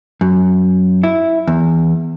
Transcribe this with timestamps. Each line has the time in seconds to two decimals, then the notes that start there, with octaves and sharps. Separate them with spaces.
0.21 F#2
1.03 E4
1.47 E2